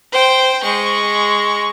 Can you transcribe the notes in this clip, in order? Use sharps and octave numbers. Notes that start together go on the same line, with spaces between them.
C5 G5
G#3 C#6